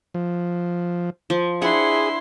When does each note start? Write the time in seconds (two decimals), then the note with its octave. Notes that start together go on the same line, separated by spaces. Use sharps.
0.14 F3
1.30 F3
1.62 D4 E4 G#4 F#5 C6